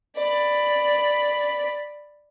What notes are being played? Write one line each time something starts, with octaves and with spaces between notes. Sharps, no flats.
D5 B5